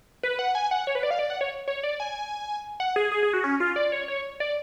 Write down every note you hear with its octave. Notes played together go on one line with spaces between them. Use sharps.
B4
F#5
G#5
F#5
C#5
B4
D5
F5
D5
F#5
C#5
C#5
D5
G#5
F#5
G#4
G#4
G#4
F#4
C#4
F4
D5
C#5
C#5
D5